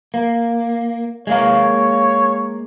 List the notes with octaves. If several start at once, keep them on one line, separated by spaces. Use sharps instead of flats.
A#3
G#3 A#3 C#5 F5